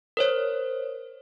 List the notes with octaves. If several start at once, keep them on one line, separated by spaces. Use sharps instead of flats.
A#4 C5 C#5